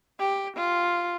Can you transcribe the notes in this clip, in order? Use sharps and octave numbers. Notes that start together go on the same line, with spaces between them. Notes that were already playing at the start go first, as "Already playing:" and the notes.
G4
F4